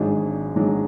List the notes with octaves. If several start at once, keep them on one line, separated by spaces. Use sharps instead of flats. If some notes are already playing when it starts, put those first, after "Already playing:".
Already playing: G#1 G#2 F#3 D4 G#4
G#1 G#2 F#3 D4 G#4